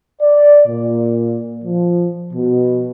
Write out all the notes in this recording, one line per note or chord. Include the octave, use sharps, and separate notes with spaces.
D5
A#2
F3
B2